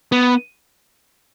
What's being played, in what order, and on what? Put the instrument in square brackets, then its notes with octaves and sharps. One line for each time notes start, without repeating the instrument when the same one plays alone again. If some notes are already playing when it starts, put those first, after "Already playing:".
[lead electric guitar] B3